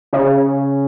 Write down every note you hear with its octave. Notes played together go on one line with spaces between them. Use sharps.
C#3